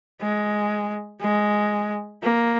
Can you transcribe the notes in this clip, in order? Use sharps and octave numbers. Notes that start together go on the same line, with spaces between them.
G#3
G#3
A#3